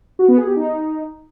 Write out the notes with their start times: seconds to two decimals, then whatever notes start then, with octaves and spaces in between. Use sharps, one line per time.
0.19 F#4
0.28 B3
0.38 G#4
0.47 G4
0.56 D#4